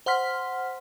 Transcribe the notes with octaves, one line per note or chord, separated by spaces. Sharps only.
C5 F#5 C6 F6 B6